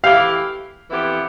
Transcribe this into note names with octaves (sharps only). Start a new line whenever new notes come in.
E3 A3 E4 G4 F5
F2 E3 B3 E4 G4